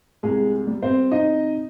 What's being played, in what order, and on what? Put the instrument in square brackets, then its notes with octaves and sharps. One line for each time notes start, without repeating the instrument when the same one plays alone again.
[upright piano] C2 G#3 G#4
G3
C4 C5
C3 D#4 D#5